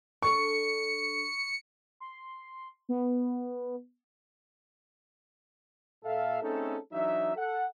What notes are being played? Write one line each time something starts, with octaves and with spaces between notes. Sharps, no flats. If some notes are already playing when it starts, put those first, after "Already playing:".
D4 A4 A#4 C#6 C#7
C6
B3
A#2 A4 E5 F5
A3 C4 C#4 D#4 G#4 A4
E3 F#3 D4 D#4 E5
A4 F#5